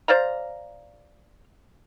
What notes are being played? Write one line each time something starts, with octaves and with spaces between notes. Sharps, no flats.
C5 D5 F5 A#5